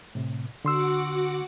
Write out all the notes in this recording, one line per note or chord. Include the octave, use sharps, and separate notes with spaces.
A2 C3
D3 F#4 F#5 C6 D6 E6